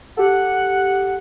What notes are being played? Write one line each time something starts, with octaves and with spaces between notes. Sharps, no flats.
G4 A4 F#5